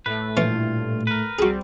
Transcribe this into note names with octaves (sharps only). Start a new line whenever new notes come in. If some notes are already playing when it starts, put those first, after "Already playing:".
A2 A3 B4
G2 A#2 E3 C#4 F4
A#4 B4
C2 G3 C4 F#4 G#4